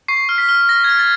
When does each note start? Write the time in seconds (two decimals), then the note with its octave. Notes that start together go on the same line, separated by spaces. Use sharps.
0.08 C#6 C7
0.29 F6
0.38 B6
0.49 F6
0.69 F6 A#6
0.84 G#6
0.89 F6
0.99 A6